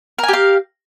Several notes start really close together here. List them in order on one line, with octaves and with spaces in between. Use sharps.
A#4 G#5 G4 F5